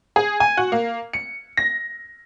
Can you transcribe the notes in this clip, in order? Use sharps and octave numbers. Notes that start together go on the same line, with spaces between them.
G#4
G#5
F#4
A#3
C#7
A#6